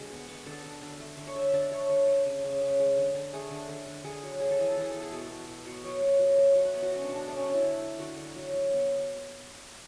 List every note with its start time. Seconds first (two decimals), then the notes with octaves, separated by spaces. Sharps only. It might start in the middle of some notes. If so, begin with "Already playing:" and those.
Already playing: B2 D3 G#3
0.10 B3
0.28 B3
0.46 D3 A4
0.64 D3
0.82 D3
1.00 A3
1.18 D3
1.27 C#5
1.35 D3 E5
1.54 D3 D5
1.71 A3 C#5
1.90 D3
2.08 A3
2.25 C#3
2.44 C#3
2.62 C#3 B4
2.80 G#3
2.97 D3
3.15 D3
3.33 A3 G#4
3.51 D3
3.69 D3
3.87 D3
4.05 D3 G#4
4.23 F#3
4.40 G#3 G#4
4.51 A4
4.59 E3 G#4
4.71 A4
4.77 E3 G#4
4.91 B3 A4
5.02 G#4
5.12 B2 A4
5.30 B2
5.48 B2
5.66 B2
5.84 F#3 C#5
6.02 B2
6.20 F#3
6.38 A3
6.55 F#3
6.65 B4
6.74 B3
6.82 F#4
6.91 F#3 C#4
7.04 D4
7.09 B2
7.15 D4
7.28 A3 D4
7.37 C#4
7.45 A3 D4
7.54 E4
7.64 D3
7.82 A3
7.99 D3 F#4
8.17 D3
8.35 F#3
8.53 F#3
8.71 B3